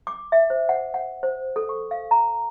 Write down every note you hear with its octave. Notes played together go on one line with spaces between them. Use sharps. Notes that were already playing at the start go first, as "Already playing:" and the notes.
D6
E5
C5
F#5
F#5
C5
A4
C#6
F5
A#5